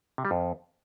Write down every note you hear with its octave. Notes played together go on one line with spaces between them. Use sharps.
C3
G3
F2